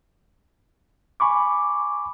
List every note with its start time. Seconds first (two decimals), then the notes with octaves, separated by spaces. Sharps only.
1.20 G#5 B5 C#6 D6